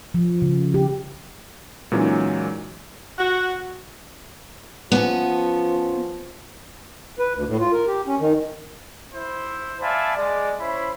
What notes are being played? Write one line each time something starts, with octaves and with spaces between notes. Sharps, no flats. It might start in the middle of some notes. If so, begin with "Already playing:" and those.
F3
C#3
G4
A#2 E3 F#3 G#3 C#4 D#4
F#4
F3 B3 C#4
B4
D2
A2
F4
A#4
G4
C#4
D#3
E4 C5
D5 E5 F5 G#5 A5 B5
G#3 D5
C#4 E4 C5 C#5 B5